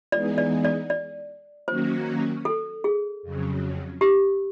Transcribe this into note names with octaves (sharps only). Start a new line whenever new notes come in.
E3 G#3 B3 D#4 G#4 D5
D5
D5
D5
D#3 F#3 A#3 C#4 F#4 C5
A4
G#4
F2 C#3 F#3
G4